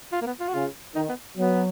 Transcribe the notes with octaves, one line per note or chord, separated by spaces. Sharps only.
F4
A#3
B3
F4
F#4
C#3 F4
D#3 D#4
B3
F#3 B3